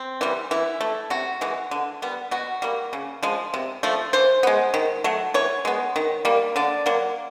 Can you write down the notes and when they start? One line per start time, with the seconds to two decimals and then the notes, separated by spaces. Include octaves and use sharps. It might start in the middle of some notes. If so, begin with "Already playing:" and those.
Already playing: C4
0.21 E3 G3
0.51 E3 E4
0.81 A3
1.10 C3 F#4
1.41 E3 G#3
1.71 D3
2.02 G3 B3
2.31 B2 F#4
2.62 G3 A#3
2.93 C#3
3.23 F3 G#3
3.54 C3
3.83 F3 A3
4.13 E3 C5
4.43 G#3 B3
4.74 D#3
5.04 F#3 A3
5.34 E3 C#5
5.65 G#3 B3
5.96 D#3
6.25 G3 A#3
6.56 D3 D5
6.86 F#3 A#3